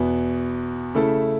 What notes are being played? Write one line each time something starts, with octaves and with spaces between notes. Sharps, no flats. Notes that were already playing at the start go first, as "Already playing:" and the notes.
Already playing: E2 B2 B3 E4
C#3 A3 E4 A4